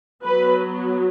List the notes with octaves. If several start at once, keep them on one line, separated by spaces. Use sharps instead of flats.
F#3 B3 B4